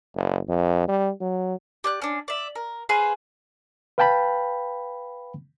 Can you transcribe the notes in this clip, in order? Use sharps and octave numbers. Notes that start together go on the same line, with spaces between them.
F#1
F2
G3
F#3
G4 D5 F#6
C#4 D4
D5 E5
A#4
G#4 B4 C5 F5
B4 F5 G5 A5 B5